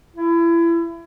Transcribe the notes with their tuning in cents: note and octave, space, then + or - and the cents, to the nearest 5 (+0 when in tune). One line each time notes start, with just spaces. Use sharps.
E4 +30